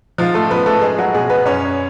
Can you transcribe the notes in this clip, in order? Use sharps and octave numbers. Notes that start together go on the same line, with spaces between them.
G#2 F3 F4
A3 A4
F3 B3 B4
A3 A4
G#3 G#4
F#3 F#4
B2 G#3 G#4
B3 B4
F#2 C#4 C#5